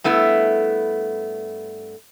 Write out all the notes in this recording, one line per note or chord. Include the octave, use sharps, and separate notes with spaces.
G2 A3 B3 E4